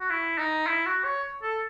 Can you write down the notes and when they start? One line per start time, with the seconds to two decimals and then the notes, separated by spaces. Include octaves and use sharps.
0.01 F#4
0.10 E4
0.38 D#4
0.67 E4
0.86 F#4
1.05 C#5
1.42 A4